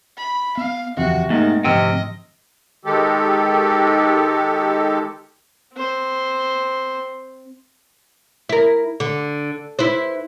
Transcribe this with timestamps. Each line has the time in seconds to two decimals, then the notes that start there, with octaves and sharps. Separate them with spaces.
0.17 B5
0.57 B3 F5
0.97 F#1 E2 C3 F3 F#4
1.30 G#2 D#3 A3 A#3
1.64 D2 G#2 C3 F3 D#5 G5 E6 F6
2.85 D#3 G#3 G4 A4
5.75 C4 C5
8.49 E4 A#4
9.00 D3
9.79 E4 B4 C5